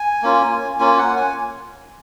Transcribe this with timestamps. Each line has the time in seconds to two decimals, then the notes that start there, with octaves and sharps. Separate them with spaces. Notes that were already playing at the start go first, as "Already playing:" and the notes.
Already playing: G#5
0.23 A#3 C#4 F4
0.79 A#3 C#4 F4 G#5
0.98 F#5
1.17 G#5